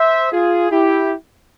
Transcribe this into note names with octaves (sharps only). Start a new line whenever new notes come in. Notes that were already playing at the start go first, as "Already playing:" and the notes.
Already playing: C5 E5
F4 G#4
E4 G4